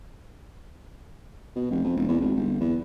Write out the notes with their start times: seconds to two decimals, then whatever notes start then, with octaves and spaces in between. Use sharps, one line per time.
1.56 B2
1.71 F1
1.84 F2
1.96 E1
2.09 E2
2.20 G#1
2.36 G1
2.60 E2